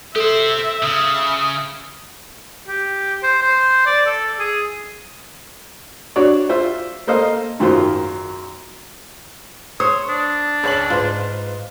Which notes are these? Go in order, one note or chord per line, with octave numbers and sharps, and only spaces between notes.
G4 A4 C5 E5
C#3 D#6
G4
C5
C5
D5
A4
G#4
D4 F#4 C#5 D5
F4 C5 E5
A#3 A4 C5 D#5 F5
G#1 F#2 D#3 F4 C5
C5 C#5 D#6
D4
C#2 C#5 F#7
G#2 F4 B4 C5